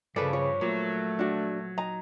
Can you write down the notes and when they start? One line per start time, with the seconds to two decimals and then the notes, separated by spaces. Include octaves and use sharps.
0.16 G2 C#3 F3 A4 B4 D5
0.33 C#5
0.61 A#2 F#3 A3
1.19 D4 F#4
1.78 D#4 A#5